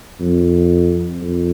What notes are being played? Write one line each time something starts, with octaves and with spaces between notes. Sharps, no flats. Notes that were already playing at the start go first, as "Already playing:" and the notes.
F2
F2